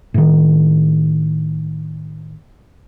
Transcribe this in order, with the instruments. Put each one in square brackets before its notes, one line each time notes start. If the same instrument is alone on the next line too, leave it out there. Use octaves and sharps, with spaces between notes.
[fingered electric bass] A2 D#3